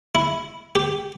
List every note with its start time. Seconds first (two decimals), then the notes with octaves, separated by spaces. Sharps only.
0.15 E4
0.75 G4